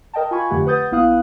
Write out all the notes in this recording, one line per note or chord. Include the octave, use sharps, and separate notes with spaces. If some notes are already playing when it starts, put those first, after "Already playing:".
A#4 D#5 G5 A5
F4 A#4 G#5 B5 C#6 G#6
F2 D3 A3 G4 F#5
B4 F#5 D#6 G6 A6
A#1 B3 E4 F5 D#6 F#6